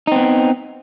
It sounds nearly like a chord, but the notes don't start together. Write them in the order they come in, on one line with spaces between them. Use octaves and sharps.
D#4 C4 B3